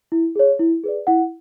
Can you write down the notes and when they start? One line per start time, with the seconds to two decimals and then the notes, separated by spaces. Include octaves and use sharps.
0.12 E4
0.36 G#4 C#5
0.60 E4
0.84 G#4 B4 D5
1.07 E4 F#5